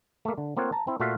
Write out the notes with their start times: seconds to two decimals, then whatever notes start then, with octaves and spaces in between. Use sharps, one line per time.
0.25 A3 A#3
0.38 D3
0.56 A3 A#3 C4 F4 C#5 F#5
0.72 A5 A#5
0.87 C4 E4
1.00 A#2 A3 F4 F#4 E5 F5